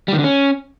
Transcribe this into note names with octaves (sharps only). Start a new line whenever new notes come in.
G3
D#3
D3
C#4